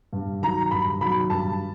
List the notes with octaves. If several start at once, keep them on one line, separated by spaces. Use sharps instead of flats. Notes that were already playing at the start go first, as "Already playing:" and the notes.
G2
D#3 F#3 A#5
G2 B5
D#3 F#3 B5
G2 A5